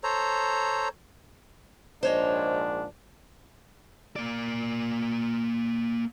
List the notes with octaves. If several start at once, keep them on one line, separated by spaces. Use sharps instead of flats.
A4 C5 C#5 A#5
A#1 G#2 D4 C5 C#5 D#5
A#3 D5